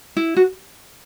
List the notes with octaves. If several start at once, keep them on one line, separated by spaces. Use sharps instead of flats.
E4
F#4